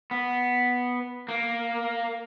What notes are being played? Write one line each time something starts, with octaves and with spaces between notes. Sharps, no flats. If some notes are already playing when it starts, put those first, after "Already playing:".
B3
A#3